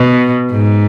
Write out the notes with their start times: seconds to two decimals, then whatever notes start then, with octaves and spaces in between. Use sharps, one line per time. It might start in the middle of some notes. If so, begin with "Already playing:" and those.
Already playing: B2
0.51 G#2